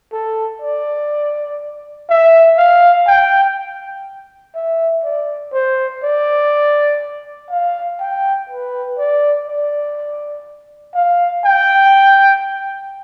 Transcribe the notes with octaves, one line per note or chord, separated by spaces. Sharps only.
A4
D5
E5
F5
G5
E5
D5
C5
D5
F5
G5
B4
D5
D5
F5
G5